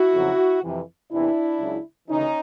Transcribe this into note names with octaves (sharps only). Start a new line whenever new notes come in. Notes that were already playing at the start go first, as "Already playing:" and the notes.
Already playing: E4 F#4
F2 C#3 F#3
F2 C3 E3
E2 C3 E3 D4 E4
C#2 C#3 F#3
D2 C#3 E3 C#4 D#4